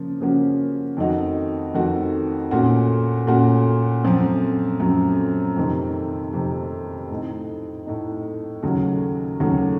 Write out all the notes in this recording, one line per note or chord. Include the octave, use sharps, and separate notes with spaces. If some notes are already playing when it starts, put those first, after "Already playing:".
Already playing: C#3 F3 A#3 C#4
C#3 F3 A#3 C#4 F#4
F2 D#3 A3 D#4 F#4
F2 D#3 A3 D#4 F#4
A#2 A3 C#4 F#4
A#2 A3 C#4 F#4
F#2 F3 A3 C4
F#2 F3 A3 C4
F2 C3 D#3 A3
F2 C3 D#3 A3
A2 A3 D#4
A2 A3 D#4
D#2 C#3 F#3 A3
D#2 C#3 F#3 A3